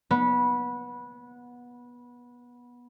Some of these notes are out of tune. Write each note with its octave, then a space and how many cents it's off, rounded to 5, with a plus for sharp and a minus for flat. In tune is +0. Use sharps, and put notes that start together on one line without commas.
B3 -20